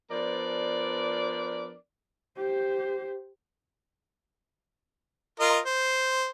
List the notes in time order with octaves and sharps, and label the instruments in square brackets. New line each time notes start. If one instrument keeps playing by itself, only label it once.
[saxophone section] F3 B3 D4 A#4 C5 D5
[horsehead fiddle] G4 C5
[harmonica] F4 A#4 D#5
C5